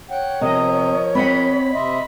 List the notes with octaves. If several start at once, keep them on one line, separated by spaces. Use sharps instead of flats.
C#5 F#5 G5
C3 F3 A#4 D#5
C4 D#5 F#5 B5
C3 D#5 E5 C6